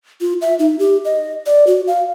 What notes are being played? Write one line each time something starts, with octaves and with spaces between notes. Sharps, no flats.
F4
E5
D#4
G4
D#5
D5
F#4
F5